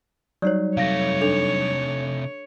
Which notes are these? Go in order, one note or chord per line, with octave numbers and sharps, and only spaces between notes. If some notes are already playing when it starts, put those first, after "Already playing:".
F#3 G3 D#4 C#5 D5
C3 A3 C#5 F5 A#6
D4 A4 F7